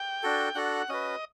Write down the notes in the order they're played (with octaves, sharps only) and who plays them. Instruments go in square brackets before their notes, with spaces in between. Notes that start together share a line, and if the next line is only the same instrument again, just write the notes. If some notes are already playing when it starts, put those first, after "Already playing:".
Already playing: [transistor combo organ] G5
[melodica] D4 F#4 A4
[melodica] D4 F#4 A4 [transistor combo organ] F#5
[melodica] C#4 F#4 B4 [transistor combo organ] D#5